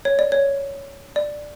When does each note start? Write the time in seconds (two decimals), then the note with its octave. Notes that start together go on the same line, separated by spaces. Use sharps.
0.05 C#5
0.19 D5
0.32 C#5
1.16 D5